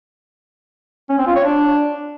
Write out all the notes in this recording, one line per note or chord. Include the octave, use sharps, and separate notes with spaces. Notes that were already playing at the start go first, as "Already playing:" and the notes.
C#4
C4
F4
C#5
D4